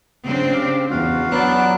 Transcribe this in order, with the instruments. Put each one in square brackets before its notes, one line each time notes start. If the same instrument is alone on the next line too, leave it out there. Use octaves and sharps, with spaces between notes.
[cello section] C#3 C4 D4
[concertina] G4 F5
[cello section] E2 [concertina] F4 F#4 F5
[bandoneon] F#3 B3 F#6 [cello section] D4